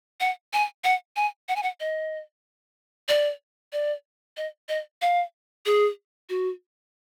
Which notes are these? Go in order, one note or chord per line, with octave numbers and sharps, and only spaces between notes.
F#5
G#5
F#5
G#5
F#5
G#5
F#5
D#5
D5
D5
D#5
D#5
F5
G#4
F#4